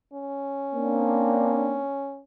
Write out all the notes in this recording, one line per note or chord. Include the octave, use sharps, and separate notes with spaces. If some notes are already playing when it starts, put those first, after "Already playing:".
C#4
A#3 C4 D4